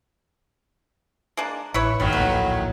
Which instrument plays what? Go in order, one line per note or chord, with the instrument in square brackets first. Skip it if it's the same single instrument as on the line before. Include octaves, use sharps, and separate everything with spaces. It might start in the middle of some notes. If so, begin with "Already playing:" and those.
[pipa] G#3 A#3 D4
[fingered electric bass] A1 [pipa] E4 B4 C#5
[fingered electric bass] G#1 F#2 [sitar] A2 D#3 F#3 [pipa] G3
[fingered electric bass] D1 A#1 A#3 [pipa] B4